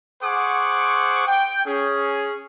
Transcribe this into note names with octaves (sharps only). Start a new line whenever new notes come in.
G#4 C5 F#5 C#6 D6
G5
C#4 G#4